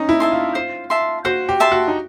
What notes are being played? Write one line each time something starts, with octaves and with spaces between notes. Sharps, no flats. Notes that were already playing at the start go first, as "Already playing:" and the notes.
Already playing: C#4 D#4
E4
E5 A5 C6
F4
C5
E5 A5 C6
F#4 C5
G4
E5 A5 C6
F#4
D#4